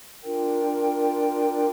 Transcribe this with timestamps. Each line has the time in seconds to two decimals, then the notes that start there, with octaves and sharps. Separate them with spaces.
0.23 D4 F4 A#4 G5